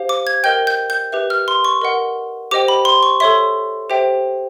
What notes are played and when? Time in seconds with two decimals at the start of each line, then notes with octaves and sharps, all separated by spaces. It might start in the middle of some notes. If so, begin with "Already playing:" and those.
Already playing: G4 C5 F5
0.09 D6
0.27 G#6
0.44 A#4 D#5 G5 G6
0.67 G6
0.90 G6
1.12 G4 B4 E5
1.30 F6
1.48 C6
1.65 C#6
1.82 A#4 D#5 F#5
2.51 G4 C5 D#5 G5 D6
2.68 B5
2.85 C6
3.03 C#6
3.20 A4 C#5 E5 C6
3.90 G4 C5 E5 G5